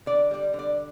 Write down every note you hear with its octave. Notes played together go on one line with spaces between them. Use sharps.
D3 D5
G3 D5
D3
D5